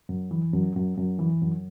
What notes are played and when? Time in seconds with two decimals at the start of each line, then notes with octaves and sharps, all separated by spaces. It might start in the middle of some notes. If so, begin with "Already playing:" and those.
0.09 F#2
0.31 E3
0.53 F#2
0.75 F#2
0.97 F#2
1.19 E3
1.41 F#2